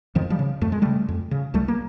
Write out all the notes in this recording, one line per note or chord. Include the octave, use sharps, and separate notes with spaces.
F2 D#3 F3
F3 G3
C#3
F2 A3
G#3
C#3 G3 A3
F2
C#3
C2 G3 A3
A#3